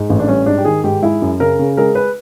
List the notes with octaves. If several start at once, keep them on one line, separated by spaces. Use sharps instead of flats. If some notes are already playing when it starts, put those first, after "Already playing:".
Already playing: G#2
A1
D4
G3 C#4
G#2 D4
G4
D#3 G#4
G#2 G4
G#3 E4
F#2
C#3 A#4
C#3
G#3 A#4
B4